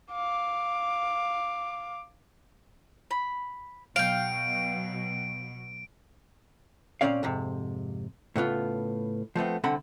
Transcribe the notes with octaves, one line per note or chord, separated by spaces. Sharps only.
F5 D6
B5
B2 F#3 F5 G5 D7
A#2 D3 C4 C#4 D5 F5
F2 G#2 C3
A2 C#3 B3 F4
F3 A3 B3 C4
C2 D3 C4 A4 F#5 B5